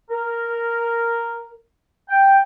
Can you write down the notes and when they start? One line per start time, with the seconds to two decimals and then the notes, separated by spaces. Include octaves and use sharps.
0.10 A#4
2.08 G5